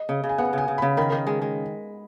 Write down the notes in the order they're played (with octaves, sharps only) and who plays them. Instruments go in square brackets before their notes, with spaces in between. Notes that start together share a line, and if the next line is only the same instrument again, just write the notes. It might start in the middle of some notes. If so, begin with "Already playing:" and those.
Already playing: [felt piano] D#5
[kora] C#3
C#3
[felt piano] G#5
[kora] B3 [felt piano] F#5
[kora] C#3 [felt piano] G#5
[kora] C#3
[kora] C#3 [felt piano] B5
[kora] D#3 [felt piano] B5
[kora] D#3
G#3
G#3